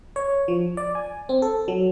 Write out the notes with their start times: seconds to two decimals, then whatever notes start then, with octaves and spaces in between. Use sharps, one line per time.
0.16 C#5
0.48 F3
0.77 D5
0.95 G#5
1.29 C4
1.42 A4
1.68 F#3